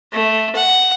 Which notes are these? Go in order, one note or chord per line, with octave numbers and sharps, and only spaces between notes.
A3
F#5